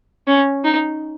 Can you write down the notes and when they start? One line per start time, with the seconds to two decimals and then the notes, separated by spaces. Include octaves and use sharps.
0.27 C#4
0.64 D#4